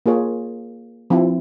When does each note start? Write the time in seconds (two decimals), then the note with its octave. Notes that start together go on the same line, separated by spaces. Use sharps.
0.06 A#3 F4 G#4 C#5
1.10 F3 C4 E4